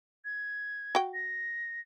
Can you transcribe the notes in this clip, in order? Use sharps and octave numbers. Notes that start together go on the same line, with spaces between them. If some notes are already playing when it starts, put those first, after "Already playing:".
G#6
F#4 G5
A#6